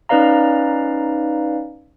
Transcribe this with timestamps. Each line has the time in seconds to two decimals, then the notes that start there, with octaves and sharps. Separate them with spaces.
0.09 C#4 D#4 B4 D5 F5 A#5